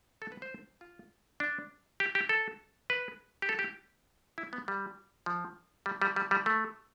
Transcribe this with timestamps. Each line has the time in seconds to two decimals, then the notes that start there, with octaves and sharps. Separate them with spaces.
0.22 A4
0.32 B4
0.42 C5
0.81 F4
1.40 D4
2.00 G4
2.15 G4
2.29 A4
2.90 B4
3.42 G4
3.49 A4
3.59 G4
4.38 E4
4.53 B3
4.68 G3
5.26 F3
5.86 G3
6.02 G3
6.16 G3
6.31 G3
6.46 A3